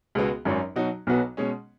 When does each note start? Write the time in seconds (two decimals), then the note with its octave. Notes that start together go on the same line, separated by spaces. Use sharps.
0.15 C#2 B2 G#3 B3 F#4
0.45 G#1 F#2 F#3 C#4
0.76 B2 F#3 D#4 F#4
1.07 B1 B2 F#3 B3 F#4
1.37 B2 G#3 C#4